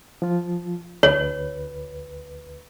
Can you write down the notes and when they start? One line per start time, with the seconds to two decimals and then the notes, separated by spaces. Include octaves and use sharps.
0.22 F3 F4
1.03 D2 B4 C#5